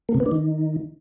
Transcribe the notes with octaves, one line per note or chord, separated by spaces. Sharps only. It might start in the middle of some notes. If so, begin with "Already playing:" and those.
A#3
C3
B3
D4
D#3